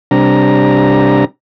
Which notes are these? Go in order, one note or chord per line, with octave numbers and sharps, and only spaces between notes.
C3 G3 D4 A#5